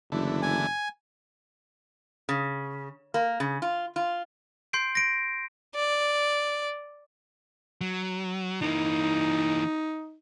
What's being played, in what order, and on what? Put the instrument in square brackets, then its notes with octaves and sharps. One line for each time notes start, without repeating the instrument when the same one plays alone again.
[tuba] F#1 [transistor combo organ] D3 E3 A3
[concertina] G#5
[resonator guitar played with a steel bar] C#3
A#3
C#3
F4
F4
[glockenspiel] C6 G6 C7 D7
A#6 D7
[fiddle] D5
[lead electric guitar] F#3
[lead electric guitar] E3 A#3 [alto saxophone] D#4